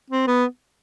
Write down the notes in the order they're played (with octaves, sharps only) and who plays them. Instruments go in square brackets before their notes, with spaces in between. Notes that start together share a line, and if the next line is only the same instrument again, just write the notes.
[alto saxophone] C4
B3